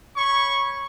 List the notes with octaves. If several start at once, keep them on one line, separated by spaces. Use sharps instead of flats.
C#5 B5 C#6